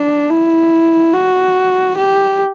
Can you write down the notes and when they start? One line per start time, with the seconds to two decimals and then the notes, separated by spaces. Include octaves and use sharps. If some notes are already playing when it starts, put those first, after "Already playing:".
Already playing: D4
0.30 E4
1.14 F#4
1.97 G4